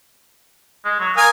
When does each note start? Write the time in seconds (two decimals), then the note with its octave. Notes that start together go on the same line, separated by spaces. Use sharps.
0.85 G#3
1.00 F#3
1.17 A#4 F5 G#5 D#6